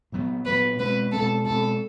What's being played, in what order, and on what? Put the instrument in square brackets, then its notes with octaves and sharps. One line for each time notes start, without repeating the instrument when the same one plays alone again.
[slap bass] A#2 F#3 B3
[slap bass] A#2 F#3 B3 [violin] B4
[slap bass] B2 G#3 C4 [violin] B4
[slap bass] B2 G#3 C4 [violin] A4
[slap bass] B2 G#3 C4 [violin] A4